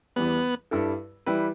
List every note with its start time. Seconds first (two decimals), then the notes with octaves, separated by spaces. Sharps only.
0.16 E2 E3 G3 B3
0.71 G2 G3 E4 A4
1.26 E3 G3 E4 G4 B4